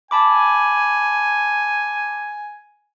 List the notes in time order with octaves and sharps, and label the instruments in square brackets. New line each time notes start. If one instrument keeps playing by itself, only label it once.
[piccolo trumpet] G#5 [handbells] A5 B5 D6